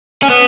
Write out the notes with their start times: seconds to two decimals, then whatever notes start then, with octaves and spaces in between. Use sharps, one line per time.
0.23 C#4
0.30 B3